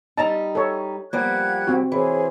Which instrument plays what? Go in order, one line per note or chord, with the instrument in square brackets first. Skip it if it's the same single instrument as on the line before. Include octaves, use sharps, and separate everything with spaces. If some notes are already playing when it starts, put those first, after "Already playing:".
[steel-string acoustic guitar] G3 D#4 [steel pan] A5 A#5
[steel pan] A4 C#5
[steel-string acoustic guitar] F3 G3 A#3 [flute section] F#5 F#6 G#6
[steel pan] C4 F#4
[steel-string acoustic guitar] E3 [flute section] G#4 C5 C#5